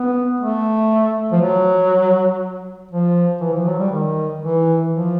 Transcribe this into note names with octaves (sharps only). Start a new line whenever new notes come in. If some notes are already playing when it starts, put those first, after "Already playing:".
Already playing: B3
A3
F3
F#3
F3
E3
F3
F#3
G3
D#3
E3
F3